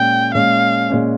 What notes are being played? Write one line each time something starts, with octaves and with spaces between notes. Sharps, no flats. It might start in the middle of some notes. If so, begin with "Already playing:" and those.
Already playing: A#2 G#3 C#4 G5
A#2 G#3 C#4 F5
A#2 G#3 C#4